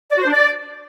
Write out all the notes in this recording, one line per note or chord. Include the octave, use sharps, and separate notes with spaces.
D5
F#4
C5
D4
D5